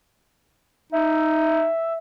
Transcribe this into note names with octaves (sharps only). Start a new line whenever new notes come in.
D#4 E5